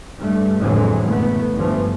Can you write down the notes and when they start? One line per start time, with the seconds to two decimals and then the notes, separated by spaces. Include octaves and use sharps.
0.19 G2 A3
0.61 F2 A2 D3 E3 F#3 G#3
1.07 F#1 A3 B3
1.55 G1 G2 E3 F3 A3